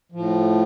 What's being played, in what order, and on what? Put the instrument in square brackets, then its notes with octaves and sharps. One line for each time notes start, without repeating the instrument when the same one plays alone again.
[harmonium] A2 F3